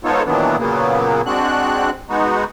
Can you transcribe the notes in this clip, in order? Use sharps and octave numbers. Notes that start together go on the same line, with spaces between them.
G#2 B3 D#4 F4 A4 C#5
A#2 D#3 E3 F#3 B3 D4
A#2 C#3 F#3 A#3 B3
G#3 C4 D4 F#4 F#6
G#3 B3 D#4 F#4